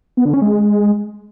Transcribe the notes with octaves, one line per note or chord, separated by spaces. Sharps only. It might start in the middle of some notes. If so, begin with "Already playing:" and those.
B3
D3
C#4
G#3